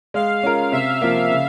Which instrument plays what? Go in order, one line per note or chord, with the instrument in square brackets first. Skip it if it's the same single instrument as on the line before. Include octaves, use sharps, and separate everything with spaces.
[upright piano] G#3 [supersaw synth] F5
[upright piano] C#4 F4 A#4
[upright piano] C3 [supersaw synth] E5
[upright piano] F3 A#3
C#3